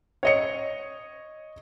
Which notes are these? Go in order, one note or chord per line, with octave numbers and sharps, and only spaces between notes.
C#5 D#5 C#7